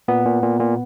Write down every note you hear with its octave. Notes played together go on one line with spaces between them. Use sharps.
A#2 B3
A#2
A#2
A#2